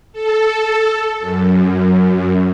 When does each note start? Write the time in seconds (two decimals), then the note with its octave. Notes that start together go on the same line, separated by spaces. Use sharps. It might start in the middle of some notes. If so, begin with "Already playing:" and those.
0.13 A4
1.19 F#2